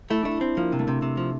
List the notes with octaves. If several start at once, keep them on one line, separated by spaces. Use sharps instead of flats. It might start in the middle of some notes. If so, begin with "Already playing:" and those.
A3 E4
A3 D4
C4
F3 A#3
C3
A3
C3
C3
F3